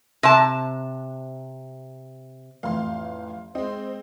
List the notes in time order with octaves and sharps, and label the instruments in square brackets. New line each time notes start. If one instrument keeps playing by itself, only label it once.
[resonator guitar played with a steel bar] C3 A5
[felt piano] A1 F2 [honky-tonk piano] F5 C6
[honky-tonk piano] G#3 C4 [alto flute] C5 [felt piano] D#5